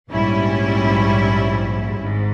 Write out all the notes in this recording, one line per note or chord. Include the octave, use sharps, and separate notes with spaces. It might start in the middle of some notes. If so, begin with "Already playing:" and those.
A#1 G#2 G3 C#4 E4
G#1 G#2